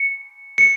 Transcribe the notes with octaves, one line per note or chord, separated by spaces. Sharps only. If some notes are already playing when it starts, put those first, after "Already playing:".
Already playing: C#7
C#7